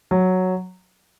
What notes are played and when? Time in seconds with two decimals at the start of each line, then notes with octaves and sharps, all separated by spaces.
0.11 F#3